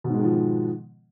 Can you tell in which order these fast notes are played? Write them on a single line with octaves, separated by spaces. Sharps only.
B2 G#2 G#3 D#3 F3